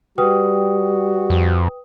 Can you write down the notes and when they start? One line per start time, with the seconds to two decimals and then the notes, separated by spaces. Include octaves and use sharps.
0.18 G3 F#4 B4 G5 D#6
1.30 F2